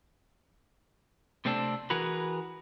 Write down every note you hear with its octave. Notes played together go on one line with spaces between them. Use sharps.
C3 A3 C4 D4 G4 A4
E3 F#4 G#4 A#4 B4